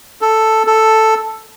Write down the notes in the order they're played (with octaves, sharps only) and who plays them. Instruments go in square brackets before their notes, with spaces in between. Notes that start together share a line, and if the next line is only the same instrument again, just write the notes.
[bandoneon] A4
A4